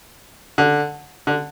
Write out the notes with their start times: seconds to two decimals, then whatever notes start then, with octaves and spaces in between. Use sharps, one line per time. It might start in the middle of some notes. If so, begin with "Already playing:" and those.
0.58 D3
1.27 D3